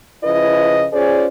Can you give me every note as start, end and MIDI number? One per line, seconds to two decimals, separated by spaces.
0.24 0.86 49
0.24 0.86 53
0.24 0.86 64
0.24 0.86 71
0.24 0.86 75
0.93 1.27 61
0.93 1.27 65
0.93 1.27 68
0.93 1.27 72
0.93 1.27 74